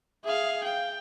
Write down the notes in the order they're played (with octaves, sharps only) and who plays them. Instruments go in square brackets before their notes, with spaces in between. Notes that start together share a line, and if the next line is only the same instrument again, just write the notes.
[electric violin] G#4 F5 [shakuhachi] E5
[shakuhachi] F5 [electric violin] G5